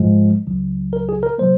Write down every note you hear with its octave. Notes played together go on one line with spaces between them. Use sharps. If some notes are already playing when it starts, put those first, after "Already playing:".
Already playing: G#2 F3 G#3
C#2 C#3 F#3
A#4
G#4
A#4
C3 F#3 A#3 C5